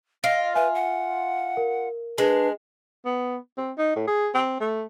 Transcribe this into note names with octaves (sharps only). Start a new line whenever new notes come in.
F4 D#5 C7 D7
B4 E5 G#5
F#5
A#4
G#3 D4 B4
B3
C4
D#4
A2
G#4
C4
A3